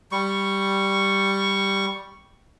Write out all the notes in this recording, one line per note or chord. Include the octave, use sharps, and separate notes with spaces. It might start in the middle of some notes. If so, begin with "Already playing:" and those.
G3 C#6